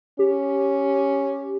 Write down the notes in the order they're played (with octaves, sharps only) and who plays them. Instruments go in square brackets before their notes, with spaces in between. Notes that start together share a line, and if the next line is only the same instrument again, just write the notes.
[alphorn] C#4 [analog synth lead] G4